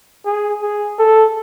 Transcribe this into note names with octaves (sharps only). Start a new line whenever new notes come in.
G#4
G#4
A4